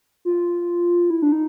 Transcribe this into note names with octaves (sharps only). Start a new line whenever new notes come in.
F4
E4
D4
D#4